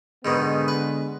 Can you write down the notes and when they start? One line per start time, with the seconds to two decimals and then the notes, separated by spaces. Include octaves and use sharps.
0.25 G#2 B2 D3 D#3 G#3 B3
0.68 B4